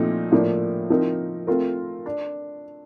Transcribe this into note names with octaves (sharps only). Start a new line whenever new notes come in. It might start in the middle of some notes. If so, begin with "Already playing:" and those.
Already playing: A#2 F3 A3 C4 D#4
A2 F3 A#3 D4
F3 C4 D#4 A#4
A3 C4 F4 A#4
D4